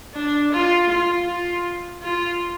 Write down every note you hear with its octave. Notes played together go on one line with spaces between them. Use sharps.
D4
F4
F4
F4
F4